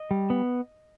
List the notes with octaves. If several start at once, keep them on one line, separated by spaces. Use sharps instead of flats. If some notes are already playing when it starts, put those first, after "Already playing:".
Already playing: D#5
G3
B3